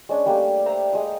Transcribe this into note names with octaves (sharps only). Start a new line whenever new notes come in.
G#3 C#4 D4
G3 A3 A#3 D4
C5 E5 A#5
G#3 D#6